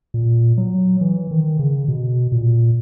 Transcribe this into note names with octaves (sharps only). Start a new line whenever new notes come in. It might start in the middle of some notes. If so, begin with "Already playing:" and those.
A#2
F#3
E3
D#3
C#3
B2
A#2